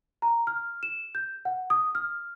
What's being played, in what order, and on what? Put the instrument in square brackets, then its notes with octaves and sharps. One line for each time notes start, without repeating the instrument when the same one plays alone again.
[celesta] A#5
F6
E7
G6
F#5
D#6
F6